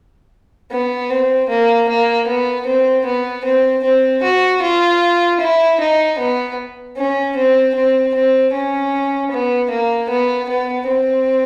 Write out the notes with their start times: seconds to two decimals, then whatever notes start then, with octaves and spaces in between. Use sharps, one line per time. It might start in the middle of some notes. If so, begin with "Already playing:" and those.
0.71 B3
1.10 C4
1.49 A#3
1.89 A#3
2.27 B3
2.66 C4
3.05 B3
3.45 C4
3.84 C4
4.23 F#4
4.62 F4
5.40 E4
5.80 D#4
6.19 B3
6.97 C#4
7.36 C4
7.75 C4
8.14 C4
8.53 C#4
9.31 B3
9.70 A#3
10.10 B3
10.49 B3
10.88 C4